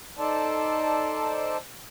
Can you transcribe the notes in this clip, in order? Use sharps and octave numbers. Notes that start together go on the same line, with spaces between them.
D#4 A4 C5 D5 A5